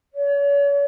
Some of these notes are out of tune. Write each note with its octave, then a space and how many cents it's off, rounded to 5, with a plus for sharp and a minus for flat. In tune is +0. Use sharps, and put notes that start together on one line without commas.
C#5 +40